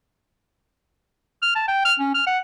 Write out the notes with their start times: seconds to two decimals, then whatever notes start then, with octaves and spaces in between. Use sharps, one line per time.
1.42 F6
1.55 A5
1.68 G5
1.85 F6
1.99 C#4
2.14 F6
2.27 F#5